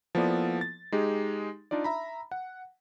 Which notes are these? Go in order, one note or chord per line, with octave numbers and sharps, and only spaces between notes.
F3 A#3 B3 E4 A4 D5
A6
G#3 D#4 G4 G#4
D4 D#4 F4 D5
E5 A#5 B5
F#5